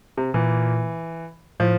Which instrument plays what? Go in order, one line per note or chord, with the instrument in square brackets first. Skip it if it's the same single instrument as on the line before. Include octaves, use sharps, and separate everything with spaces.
[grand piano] C3
[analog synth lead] A#2 [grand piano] E3
[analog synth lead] A2 [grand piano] F3